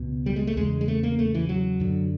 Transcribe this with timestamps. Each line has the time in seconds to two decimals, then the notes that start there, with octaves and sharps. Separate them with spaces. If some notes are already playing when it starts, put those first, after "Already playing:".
Already playing: C#2 B2
0.26 G3
0.36 G#3
0.47 A3
0.57 E2 C#3 G#3
0.81 G#3
0.88 A3
1.03 A#3
1.19 A3
1.35 E3
1.49 F#3
1.80 F#2 D3